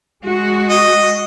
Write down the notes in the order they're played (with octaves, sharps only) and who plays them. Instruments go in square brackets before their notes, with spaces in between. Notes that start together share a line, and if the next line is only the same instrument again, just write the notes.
[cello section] G#3 F#4
[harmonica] D#5